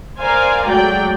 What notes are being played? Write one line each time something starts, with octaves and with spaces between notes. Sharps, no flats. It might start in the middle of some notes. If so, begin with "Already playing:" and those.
A#4 C5 D5 F5 G#5 A#5
F#3 G#3 A3 D5 G5